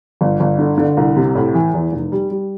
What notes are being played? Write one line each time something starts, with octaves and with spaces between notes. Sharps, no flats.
G1
G1
D3
D3
C2
C3
A2
E3
E2
F1
G3
G3